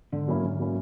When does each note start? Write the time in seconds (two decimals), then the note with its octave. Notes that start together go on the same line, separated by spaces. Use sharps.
0.12 G#2 D3
0.28 F#3 A#3 C#4 E4
0.44 D3
0.60 F#3 A#3 C#4 E4